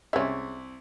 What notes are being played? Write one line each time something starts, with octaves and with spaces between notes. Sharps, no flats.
C2 G#3 C#4 E5